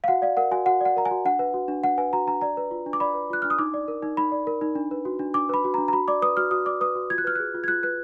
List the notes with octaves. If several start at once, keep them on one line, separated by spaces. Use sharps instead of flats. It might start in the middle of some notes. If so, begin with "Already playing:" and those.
F5
F#4 F#5
D5 F5
A#4 F#5
F#4 G#5
F#4 F#5
D5 F#5
A#4 A#5
G#5
F#4
D4 F#5
B4
F#4
D4
D4 F#5
B4 G#5
F#4 A#5
D4 A#5
D5 A#5
B4
F4
D4
D6
D5 B5
B4
F4 F#6
D4 F6
D#6
D#4 D6
D5
A#4
D#4
D#4 B5
D5
A#4
D#4
D4
B4
F#4
D4
D4 D6
B4 B5
F#4
D4 A#5
A#5
F#4 B5
D5 D6
B4 D#6
F#4 F6
F#4 D#6
D5 D6
B4 D#6
F#4
F4 G#6
F#6
B4 F6
G#4 F#6
F4
G#6
F4 F#6
B4 F#6